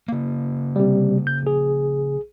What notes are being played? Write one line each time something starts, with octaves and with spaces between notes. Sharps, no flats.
C#3 A#3
C3 G3
G6
A#1 G#4